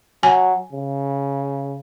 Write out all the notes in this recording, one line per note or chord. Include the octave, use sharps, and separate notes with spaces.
F#3 G#5
C#3